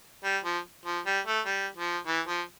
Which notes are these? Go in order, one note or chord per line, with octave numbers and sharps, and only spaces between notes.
G3
F3
F3
G3
A3
G3
F3
E3
F3